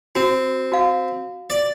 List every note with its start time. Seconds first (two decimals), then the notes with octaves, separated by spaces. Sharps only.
0.15 C4 F#4
0.72 F#4 F5
1.50 D5